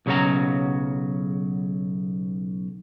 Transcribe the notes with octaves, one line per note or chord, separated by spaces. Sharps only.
B1 C#3 F#3 C#4 F#4 A#5